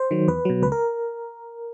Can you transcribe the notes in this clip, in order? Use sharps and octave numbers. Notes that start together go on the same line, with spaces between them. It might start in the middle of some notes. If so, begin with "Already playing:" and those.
Already playing: C5
D#3 F#3
E2 B4
B2 F#3
C#2 B4
A#4